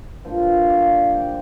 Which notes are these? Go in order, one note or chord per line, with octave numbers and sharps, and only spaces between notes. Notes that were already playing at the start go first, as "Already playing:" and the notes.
G2 F3 A#3 C5
F5
D5
G5